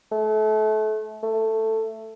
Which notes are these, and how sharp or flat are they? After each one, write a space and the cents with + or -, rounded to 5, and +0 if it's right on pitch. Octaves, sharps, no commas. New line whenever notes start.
A3 -30
A3 +10